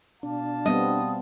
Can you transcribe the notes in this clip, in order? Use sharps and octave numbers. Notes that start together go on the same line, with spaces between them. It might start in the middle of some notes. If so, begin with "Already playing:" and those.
B2 D4 F5 A5
G3 B3 C4 D#5